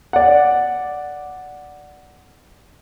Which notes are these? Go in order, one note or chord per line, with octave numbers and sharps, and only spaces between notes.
D5 F#5